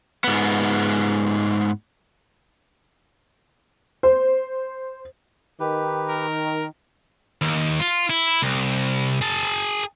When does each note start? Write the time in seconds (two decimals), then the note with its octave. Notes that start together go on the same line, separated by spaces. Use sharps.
0.24 G#2 B3
4.03 C5
5.60 D#3 G4 B4
6.09 A#4
7.42 D#2
7.80 F4
8.10 E4
8.42 C2
9.21 G#4 A5